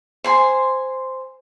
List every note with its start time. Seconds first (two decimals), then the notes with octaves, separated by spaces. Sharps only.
0.24 C5 G#5 C6